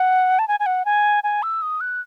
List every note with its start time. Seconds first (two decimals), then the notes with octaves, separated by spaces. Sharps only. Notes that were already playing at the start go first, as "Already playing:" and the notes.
Already playing: F#5
0.39 A5
0.48 G#5
0.60 G#5
0.66 F#5
0.85 G#5
1.24 G#5
1.43 E6
1.62 D#6
1.81 F#6